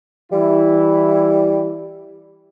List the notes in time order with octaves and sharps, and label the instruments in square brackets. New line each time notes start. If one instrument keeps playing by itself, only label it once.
[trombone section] E3 E4 [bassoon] G3